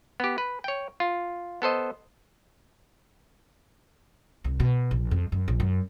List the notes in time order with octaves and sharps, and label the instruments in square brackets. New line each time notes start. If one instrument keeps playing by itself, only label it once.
[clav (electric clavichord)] B3 G4
B4
C#5 G5
F4
B3 A4 C5 D#5
[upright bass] C2
B2
A#1
F2
F#2
A#1
F#2